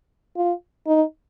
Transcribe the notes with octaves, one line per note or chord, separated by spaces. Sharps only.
F4
D#4